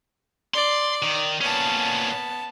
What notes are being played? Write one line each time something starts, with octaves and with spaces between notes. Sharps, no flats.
D5 C6
D#3
A#2 B3 C#4 A5